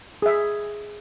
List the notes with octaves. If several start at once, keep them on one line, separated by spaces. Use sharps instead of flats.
G#4 E5